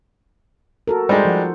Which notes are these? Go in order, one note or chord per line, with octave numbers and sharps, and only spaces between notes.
F#4 A4 A#4
G3 G#3 D#4 C5
F3 F#5